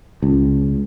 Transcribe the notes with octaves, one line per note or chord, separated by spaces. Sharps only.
C#2